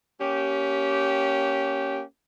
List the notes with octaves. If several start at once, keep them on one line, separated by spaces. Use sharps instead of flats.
A#3 C#4 G4